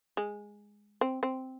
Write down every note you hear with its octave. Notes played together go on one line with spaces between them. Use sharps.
G#3
C4
C4